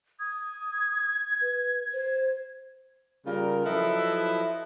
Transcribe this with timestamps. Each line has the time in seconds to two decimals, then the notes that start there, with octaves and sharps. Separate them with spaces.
0.20 D#6 G#6
1.41 B4
1.93 C5
3.26 C#3 G3 A#3 F4 A#4
3.65 F3 F#3 E4 A4 B4 D#5